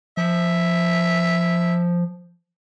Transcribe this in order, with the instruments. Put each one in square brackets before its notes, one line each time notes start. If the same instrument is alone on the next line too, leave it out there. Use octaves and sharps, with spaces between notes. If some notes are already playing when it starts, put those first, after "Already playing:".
[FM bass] F3 [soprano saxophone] E5